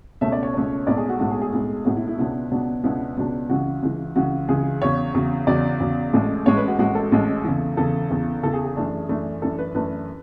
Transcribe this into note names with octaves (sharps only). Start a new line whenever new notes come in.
C#2 B2 A3 C#4 E5
D5
C#5
C#2 B2 A3 C#4
B1 A2 G#3 D5
G#4
F#4
B1 A2 G#3 F#4
G#4
G#4
B1 A2 G#3
B1 A2 G#3 F#4
E4
E4
C#2 B2 F#3 B3 D4 E4
C#2 B2 F#3 B3 D4
C#2 B2 F#3 B3 D4 E4
C#2 B2 F#3 B3 D4
C#2 C#3 E3 F#4
C#2 C#3 E3
C#2 C#3 E3 F#4
C#2 C#3 E3 G#4
E2 C#3 F#3 C#5
E2 C#3 F#3
E2 C#3 F#3 D5
E2 C#3 F#3
A1 A2 G#3
A1 A2 G#3 C#5
B4
F#4
A1 A2 G#3 F#4
A4
A1 A2 G#3
E2 C#3 E3
E2 C#3 E3 A4
E2 C#3 E3
E2 C#3 E3 A4
G#4
G#4
F#2 E3 A3 D4
F#2 E3 A3 D4
F#2 E3 A3 D4 A4
B4
F#2 E3 A3 D4 B4